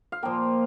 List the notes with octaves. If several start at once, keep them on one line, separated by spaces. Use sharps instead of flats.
F5
A#2 F3 A#3 G5